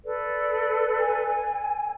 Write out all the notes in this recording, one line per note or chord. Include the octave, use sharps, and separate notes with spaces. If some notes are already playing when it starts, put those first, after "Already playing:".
A4 B4 D5
G#5